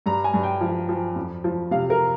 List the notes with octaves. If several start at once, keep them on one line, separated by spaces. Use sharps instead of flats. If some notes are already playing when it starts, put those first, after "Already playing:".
G2 A#5
G#5
G2
G5
F3
F3
F2
F3
C3 F5
A#4